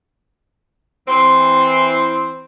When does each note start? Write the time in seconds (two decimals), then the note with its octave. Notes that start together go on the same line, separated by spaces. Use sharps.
1.08 E3 C4